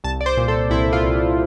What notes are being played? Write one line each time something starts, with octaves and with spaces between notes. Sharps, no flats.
C2 A5
D5
C5
A#2
A4
C2 E4
F4
C2